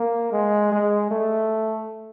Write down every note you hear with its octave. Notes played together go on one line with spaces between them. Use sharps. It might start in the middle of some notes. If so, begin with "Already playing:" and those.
Already playing: A#3
G#3
G#3
A3